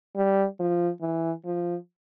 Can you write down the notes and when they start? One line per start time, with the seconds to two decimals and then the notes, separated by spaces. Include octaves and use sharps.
0.16 G3
0.59 F3
1.02 E3
1.45 F3